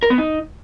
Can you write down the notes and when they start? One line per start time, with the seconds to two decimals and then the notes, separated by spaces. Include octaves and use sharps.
0.03 A#4
0.10 B3
0.18 D#4